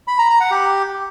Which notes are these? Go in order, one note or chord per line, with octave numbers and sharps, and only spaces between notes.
B5
A#5
A#5
F#5
G4